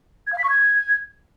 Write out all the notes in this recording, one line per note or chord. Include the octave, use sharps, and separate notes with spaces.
G#6
F5
B6
C#6
G#6